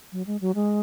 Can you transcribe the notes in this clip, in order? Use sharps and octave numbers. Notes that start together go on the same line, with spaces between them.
F#3
G#3
F#3
G#3